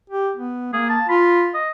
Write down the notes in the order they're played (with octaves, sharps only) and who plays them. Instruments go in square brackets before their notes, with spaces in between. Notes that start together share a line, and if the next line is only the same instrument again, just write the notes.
[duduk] G4
B3
[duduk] A#3 [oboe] G#4
[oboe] A5
[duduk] F4 [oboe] B5
[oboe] D#5